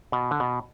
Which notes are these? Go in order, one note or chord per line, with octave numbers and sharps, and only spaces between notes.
B2
D3
B2